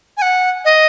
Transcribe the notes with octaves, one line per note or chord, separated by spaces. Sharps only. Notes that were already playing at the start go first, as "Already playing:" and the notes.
G#5
F#5
D#5